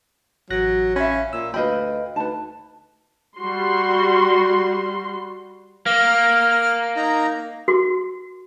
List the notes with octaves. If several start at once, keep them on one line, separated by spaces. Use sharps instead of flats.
A1 F#3 F#6 A#6
C#4 E5 F5 B5
A#2 E6
D2 B4 D#5 F5 G5 B5
D2 D#4 B4 A5
G3 F#4 C6
A#3 F6
D#4 A#5
F#4